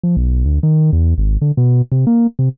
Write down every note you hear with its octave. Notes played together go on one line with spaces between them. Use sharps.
F3
B1
D2
D#3
E2
G#1
D3
B2
C3
A#3
C3